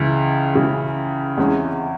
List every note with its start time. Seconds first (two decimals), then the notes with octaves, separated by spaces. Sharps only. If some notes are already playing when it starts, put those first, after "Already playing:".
Already playing: C#2 C#3 E3
0.54 C#2 C#3 E3
1.38 E2 C3 E3 G#3 C#4